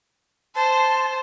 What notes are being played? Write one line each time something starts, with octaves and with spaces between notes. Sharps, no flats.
C5 A5